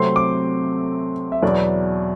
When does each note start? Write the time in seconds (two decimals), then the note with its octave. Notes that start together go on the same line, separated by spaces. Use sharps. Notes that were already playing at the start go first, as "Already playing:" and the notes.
Already playing: C3 F#3 A3 C4 C6
0.16 D6
1.32 E5
1.42 E2 B2 F#3 B3 E4 D5